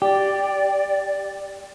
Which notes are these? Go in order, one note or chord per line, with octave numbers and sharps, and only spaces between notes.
G4 D5